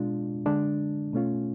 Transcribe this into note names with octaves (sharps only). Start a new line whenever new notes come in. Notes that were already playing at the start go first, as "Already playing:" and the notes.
Already playing: B2 G#3 D4 F4
D3 G#3 D4
B2 A3 C#4 F4